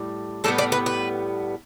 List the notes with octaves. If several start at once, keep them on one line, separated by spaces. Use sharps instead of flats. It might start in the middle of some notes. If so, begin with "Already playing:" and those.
Already playing: A2 G3
A2 G3 B3 A4
D5
B4
B4